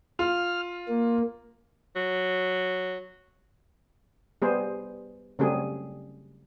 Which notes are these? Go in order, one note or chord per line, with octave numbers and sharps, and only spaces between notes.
F4 F6
A#3
F#3
G3 B3 G#4 C5
C#3 F#3 G3 A3 C4 G#4